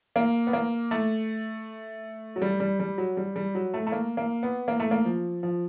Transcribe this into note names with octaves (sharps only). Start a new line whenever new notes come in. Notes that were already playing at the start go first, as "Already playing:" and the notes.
A#3
B3
A#3
A3
F#3
G3
G3
G3
F#3
G3
G3
F#3
A3
A3
A#3
A#3
B3
A#3
A3
A#3
F3
F3